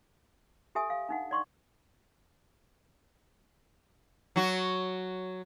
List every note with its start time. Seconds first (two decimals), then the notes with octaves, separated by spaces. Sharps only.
0.75 G4 A4 E5 G#5 D#6
0.90 F5
1.09 D4 D#4 F#5
1.31 D5 C6 C#6
4.36 F#3 F#4